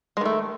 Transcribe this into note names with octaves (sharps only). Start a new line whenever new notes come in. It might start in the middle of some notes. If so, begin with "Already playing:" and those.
D#3 G#3 A3